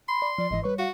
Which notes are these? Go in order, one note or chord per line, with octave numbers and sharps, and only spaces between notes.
B5 C6
D5
F3 D5
G1 G#2 E3 D#5
G3 B4 C#5 C#6
F#4 F5